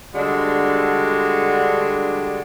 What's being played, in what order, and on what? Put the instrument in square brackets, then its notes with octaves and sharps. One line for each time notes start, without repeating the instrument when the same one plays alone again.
[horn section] D3 G3 G#3 D4 F#4